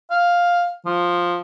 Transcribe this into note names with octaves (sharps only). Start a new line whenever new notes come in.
F5
F3